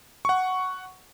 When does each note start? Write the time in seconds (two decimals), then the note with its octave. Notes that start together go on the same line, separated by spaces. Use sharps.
0.25 F#5 C#6